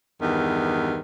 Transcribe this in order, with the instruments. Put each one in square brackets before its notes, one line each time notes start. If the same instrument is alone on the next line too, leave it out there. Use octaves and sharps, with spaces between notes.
[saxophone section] E2 G2 D#3